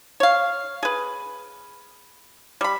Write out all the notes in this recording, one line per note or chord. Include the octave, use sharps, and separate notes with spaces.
C#5 F5
G#4 B4
G3 B5